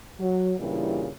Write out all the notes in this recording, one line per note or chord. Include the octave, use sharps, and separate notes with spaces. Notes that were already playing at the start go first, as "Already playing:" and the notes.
F#3
G2 A#2 C#3 E3 G3 E4